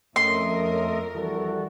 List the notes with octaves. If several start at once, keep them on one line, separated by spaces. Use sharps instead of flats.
F2 A3 C#4 A#4 D#5 E5 C6
E3 G3 F#4 A4